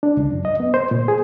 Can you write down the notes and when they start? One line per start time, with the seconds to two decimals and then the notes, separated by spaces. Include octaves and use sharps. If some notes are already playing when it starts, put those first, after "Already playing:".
0.03 D4
0.17 C#2
0.32 F#2
0.45 D#5
0.60 B3
0.74 C5
0.91 A#2
1.08 G#4